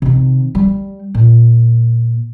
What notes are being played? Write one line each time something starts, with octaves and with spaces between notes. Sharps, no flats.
C3 D#3
G3
A#2